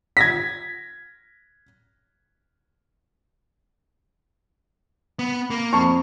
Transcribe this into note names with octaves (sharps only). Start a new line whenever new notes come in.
G#6 A#6 B6
B3
A#3
F2 A5 C#6